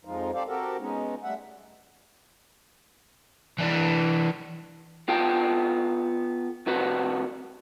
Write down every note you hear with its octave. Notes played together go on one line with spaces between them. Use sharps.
F2 F3 G#3 D#4 F4
G4 A4 C5 D5 F5
C4 F#4 G4 A4 A#4
G#3 B3 C#4 D#4
G3 A3 E5 F#5
E3 D4
B3 F4 A4 G5
C2 F2 C3 F#4 B4